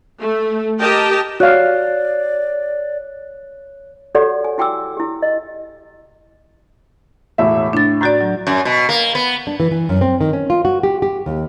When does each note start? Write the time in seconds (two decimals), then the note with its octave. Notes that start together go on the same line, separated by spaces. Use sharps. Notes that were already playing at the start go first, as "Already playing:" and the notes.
0.20 A3
0.79 G4 A#4 D#5 G5 A5
1.40 F#4 C#5 D5 F5 F#6
4.15 F#4 G4 A4 C#5 D5 F#5
4.44 G#5
4.58 E4 F#4 G5 G#5 D6 E6
4.97 E4 G4
5.22 D#5
7.38 E1 A2 E5
7.73 A2 D4 A6
8.01 A2 F#4 D5 A#5 G6 A6
8.21 F#3
8.47 F#2
8.65 B2
8.89 A#3
9.15 B3
9.47 D4
9.60 E3
9.71 E3
9.89 F#2
10.01 C4
10.21 D#3
10.33 C#4
10.50 F4
10.65 F#4
10.83 G4
11.02 G4
11.26 D#2